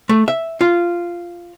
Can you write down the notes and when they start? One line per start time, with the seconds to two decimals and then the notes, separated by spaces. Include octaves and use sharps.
0.09 A3
0.28 E5
0.61 F4